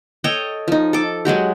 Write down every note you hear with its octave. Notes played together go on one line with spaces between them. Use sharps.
A4 C#5 D#5 G5
F3 D#4
A4 D6
F#3 G#3 F#4 G4